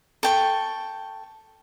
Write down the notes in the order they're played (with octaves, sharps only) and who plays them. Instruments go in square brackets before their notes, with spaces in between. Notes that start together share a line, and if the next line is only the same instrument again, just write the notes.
[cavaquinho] A4 G5 C#6